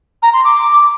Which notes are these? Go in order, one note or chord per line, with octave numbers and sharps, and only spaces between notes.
A#5
C6
D6